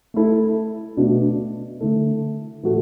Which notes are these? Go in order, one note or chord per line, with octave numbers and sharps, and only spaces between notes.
A3 E4 A4
B2 A3 D4 F#4
D3 A3 E4 A4
A2 E3 A3 F#4 A4